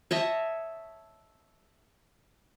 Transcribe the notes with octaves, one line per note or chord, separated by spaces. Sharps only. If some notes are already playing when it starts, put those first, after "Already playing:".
C#5 D#5 E5 A5